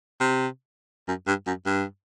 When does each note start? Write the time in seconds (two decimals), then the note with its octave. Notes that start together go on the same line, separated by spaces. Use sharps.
0.21 C3
1.08 F#2
1.27 G2
1.47 F#2
1.66 G2